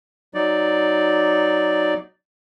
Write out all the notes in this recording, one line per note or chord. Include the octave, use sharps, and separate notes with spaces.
F#3 D#4 D5